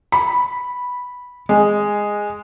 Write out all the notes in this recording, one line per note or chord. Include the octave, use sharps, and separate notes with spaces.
B5
G#3